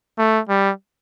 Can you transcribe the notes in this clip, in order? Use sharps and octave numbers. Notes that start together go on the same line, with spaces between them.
A3
G3